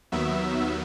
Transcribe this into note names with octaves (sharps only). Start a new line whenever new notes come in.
D#2 D#3 F#3 B3 E5